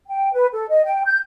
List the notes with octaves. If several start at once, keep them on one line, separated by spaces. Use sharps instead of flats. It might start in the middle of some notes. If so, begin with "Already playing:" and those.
G5
B4
A4
D#5
G5
G6